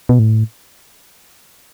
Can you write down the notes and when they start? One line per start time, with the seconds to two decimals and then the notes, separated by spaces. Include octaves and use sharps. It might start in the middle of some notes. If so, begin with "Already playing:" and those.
0.09 B2
0.19 A2